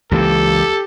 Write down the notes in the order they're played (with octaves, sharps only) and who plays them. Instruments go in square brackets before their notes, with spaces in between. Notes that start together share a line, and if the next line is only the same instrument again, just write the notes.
[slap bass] C#2 E3 A#3 [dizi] G4 [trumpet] A4